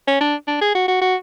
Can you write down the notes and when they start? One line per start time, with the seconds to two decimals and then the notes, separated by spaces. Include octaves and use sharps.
0.07 C#4
0.21 D4
0.48 D4
0.61 G#4
0.75 F#4
0.88 F#4
1.01 F#4